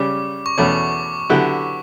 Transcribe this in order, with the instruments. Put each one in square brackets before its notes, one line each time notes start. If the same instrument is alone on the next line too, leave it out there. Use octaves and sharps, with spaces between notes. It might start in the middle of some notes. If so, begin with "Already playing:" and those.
Already playing: [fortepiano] C#3 G3 C#4 G4 [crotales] D6
[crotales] C#6
[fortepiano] E2 B2 A3 C#4 [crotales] D6
[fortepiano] D3 F#3 B3 E4 G4